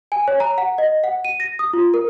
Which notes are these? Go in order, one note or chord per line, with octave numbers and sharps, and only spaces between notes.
G#5
C#5
A#5
F#5
D#5
F#5
D#7
A#6
D#6
F4
A#4